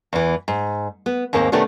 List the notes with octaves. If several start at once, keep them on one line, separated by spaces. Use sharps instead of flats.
E2 E3
G#2
B3
D#2 G#2 A#3 C4
C3 D#3 A3 B3 C#4 D4